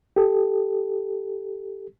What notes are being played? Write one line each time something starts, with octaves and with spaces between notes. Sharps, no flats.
G4 A4